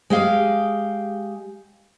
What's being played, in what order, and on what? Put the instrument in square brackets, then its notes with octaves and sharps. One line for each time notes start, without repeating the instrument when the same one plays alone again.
[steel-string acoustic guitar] G#3 G4 F5